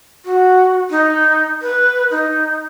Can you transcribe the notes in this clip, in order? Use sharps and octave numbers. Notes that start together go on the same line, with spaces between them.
F#4
D#4
B4
D#4